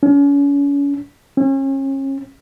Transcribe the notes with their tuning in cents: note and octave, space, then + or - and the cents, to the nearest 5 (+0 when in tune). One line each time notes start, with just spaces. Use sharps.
C#4 +35
C#4 -35